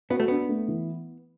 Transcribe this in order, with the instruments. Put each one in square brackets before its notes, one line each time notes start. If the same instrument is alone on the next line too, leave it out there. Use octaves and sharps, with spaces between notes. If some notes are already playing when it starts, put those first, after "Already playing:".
[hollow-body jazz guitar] B3 [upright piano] F#4
[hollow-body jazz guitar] A3
[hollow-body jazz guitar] B3 [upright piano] D4
[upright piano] A3
E3